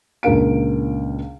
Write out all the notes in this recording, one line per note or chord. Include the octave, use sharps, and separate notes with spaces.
C#2 A#2 D4 A#4 F5 D7